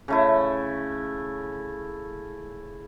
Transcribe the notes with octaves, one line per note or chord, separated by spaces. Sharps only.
C#3 A3 E4